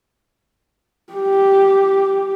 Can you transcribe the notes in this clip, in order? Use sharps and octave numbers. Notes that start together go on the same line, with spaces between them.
G4